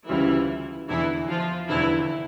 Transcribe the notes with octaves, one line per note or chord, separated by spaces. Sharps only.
D2 C#3 E3 G3 C#4 E4 F4
F1 E2 D3 E3 E4
F3 F4
F1 E2 D3 E3 E4